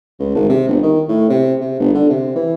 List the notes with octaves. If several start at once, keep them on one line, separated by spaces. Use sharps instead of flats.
C#2
G#1
C3
G1
D#3
A2
C3
C3
G1
D3
C3
E3